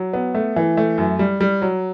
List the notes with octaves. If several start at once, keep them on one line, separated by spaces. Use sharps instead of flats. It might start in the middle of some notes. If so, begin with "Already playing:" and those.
Already playing: F#3
B3
A3
E3
A3
F#2
G3
G3
F#3